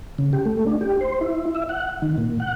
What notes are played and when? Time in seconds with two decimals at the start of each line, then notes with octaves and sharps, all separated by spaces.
0.18 C#3
0.33 G4
0.45 A3
0.66 D4
0.81 G4
1.01 C5
1.21 E4
1.55 E5
1.69 F#5
2.02 D#3
2.18 A#2
2.40 F#5